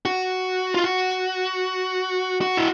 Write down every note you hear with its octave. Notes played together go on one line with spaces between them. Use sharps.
F#4
F4
F#4
F#4
E4